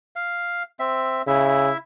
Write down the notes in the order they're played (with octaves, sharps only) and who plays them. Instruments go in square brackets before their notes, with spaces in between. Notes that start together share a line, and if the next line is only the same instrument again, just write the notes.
[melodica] F5
C4 E5
[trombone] C#3 [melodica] E4 E5